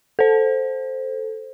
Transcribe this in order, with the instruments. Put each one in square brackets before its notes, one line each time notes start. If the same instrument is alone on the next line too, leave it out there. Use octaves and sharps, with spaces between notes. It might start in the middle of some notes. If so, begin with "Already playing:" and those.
[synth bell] A4 C5